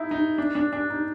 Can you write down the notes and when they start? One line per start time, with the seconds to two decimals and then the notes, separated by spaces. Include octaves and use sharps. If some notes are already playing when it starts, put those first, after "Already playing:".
Already playing: D#4 E4
0.11 D#4
0.38 D4
0.55 D4
0.73 D4
0.90 D#4